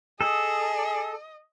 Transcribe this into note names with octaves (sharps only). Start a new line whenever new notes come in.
G#4 A4 D#5